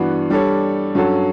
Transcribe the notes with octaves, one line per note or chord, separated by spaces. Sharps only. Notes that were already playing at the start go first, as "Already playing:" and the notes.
Already playing: G2 E3 B3 D4 F#4
G3 D4 A4 C#5
G2 F#3 C#4 F#4 A4